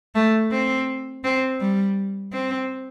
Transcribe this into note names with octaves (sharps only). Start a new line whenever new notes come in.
A3
C4
C4
G3
C4